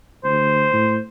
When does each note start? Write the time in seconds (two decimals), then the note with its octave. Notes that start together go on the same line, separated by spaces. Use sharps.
0.24 D2 C5
0.73 A2